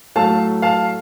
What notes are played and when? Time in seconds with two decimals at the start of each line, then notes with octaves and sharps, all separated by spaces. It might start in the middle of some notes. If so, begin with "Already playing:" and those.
0.16 A2 F#3 A3 F5 A5
0.62 F5 A5